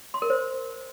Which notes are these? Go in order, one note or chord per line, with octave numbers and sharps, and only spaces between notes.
C6
A#4
C5